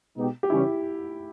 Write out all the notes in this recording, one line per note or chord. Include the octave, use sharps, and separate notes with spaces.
B2 G#3 B3 D#4 G4
G4
C#3 E3 G3 C#4 E4